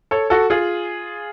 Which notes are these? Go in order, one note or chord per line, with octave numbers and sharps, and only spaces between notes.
A4 C#5
F#4 A4
F4 G#4